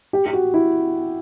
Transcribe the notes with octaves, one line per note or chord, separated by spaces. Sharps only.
G4
G4
F#4
E4